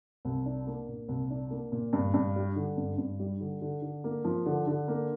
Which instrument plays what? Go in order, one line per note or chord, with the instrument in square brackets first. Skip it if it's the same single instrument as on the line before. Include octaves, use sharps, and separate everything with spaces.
[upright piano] C2
D4
A#3
A#2
C2
D4
A#3
A#2
G2
G2
G3
D3
G2
G2
G3
D3
D3
D3
A#3
F3
D3
D3
A#3